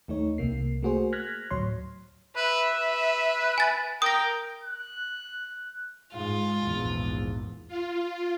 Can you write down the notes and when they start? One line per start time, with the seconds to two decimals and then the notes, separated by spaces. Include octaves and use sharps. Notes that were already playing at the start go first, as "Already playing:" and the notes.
0.08 D#2 A3 D#4 C#5
0.38 C2 C3 A#3 C7
0.83 A3 A#3 F#4 G#4 C5
1.13 F6 F#6 G#6 A#6 B6
1.51 D2 A2 F#3 C#5 C6
2.36 B4 E5
2.73 B4
3.58 G#5 A6
4.02 A#4 G5 D#6 A#6
4.63 F#6
6.13 G#2 G#3 F4
6.63 A#1 E2 G#2
7.68 F4